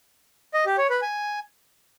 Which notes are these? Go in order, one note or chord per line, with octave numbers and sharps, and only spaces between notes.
D#5
G4
C#5
B4
G#5